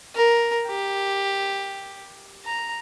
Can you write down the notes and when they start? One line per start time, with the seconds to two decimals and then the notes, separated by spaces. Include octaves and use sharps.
0.16 A#4
0.68 G4
2.46 A#5